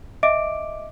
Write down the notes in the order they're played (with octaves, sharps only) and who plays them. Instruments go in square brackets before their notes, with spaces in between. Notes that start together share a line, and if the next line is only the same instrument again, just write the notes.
[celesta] D#5 E5 D6 D7